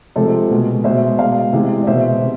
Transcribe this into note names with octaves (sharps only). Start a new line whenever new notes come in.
C3 F3 G#3 A4 C5
B2 G#3
B2 G#3 C5 E5
B2 G#3 D5 F5
C3 E3 G#3
D5
B2 G#3 C5 E5
C3